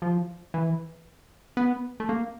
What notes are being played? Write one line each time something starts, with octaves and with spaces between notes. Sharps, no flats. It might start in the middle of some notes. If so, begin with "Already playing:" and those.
F3
E3
B3
A3
A#3